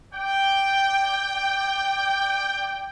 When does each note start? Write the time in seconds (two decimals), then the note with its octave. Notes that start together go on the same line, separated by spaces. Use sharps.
0.13 D5 G5